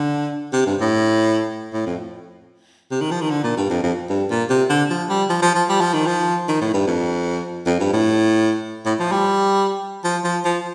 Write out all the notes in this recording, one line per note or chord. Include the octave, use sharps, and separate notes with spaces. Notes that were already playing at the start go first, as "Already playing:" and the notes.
Already playing: D3
C3
G2
A2
A2
F2
C3
D#3
F3
D#3
D3
A#2
G2
F2
F2
G2
A#2
C3
D3
F3
G3
F3
F3
F3
G3
F3
D#3
F3
D#3
A2
G2
F2
F2
G2
A2
A2
F3
G3
F3
F3
F3